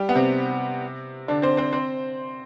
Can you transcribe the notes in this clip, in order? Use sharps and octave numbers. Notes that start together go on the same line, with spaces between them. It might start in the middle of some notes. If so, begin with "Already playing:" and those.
Already playing: G3 G4
B3
C3 C4
D3 D4
C4 C5
C4 C5
C4 C5